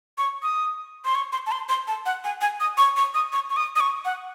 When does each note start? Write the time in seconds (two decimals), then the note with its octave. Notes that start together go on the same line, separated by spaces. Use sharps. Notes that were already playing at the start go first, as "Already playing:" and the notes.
0.18 C#6
0.43 D#6
1.05 C6
1.15 C#6
1.32 C6
1.47 A5
1.52 C6
1.69 C6
1.88 A5
2.06 F#5
2.24 G#5
2.41 G#5
2.60 D#6
2.78 C#6
2.97 C#6
3.14 D#6
3.33 C#6
3.50 C#6
3.57 D#6
3.76 D#6
3.80 C#6
4.05 F#5